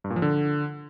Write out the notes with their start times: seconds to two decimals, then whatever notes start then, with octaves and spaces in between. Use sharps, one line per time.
0.04 G2
0.10 A#2
0.16 F3
0.22 D3